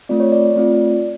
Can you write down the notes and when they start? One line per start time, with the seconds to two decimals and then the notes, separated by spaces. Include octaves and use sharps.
0.09 A3 C4 F4 D5
0.20 C#5
0.32 D5
0.56 A3 C4 F4